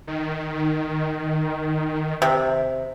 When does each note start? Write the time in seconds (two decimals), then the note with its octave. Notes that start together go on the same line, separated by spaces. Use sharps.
0.07 D#3
2.22 C3